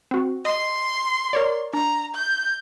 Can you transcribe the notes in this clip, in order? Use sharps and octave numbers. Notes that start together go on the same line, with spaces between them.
C4 F#4
D#5 C6
A#4 C#5 D5
D4 A#5
G6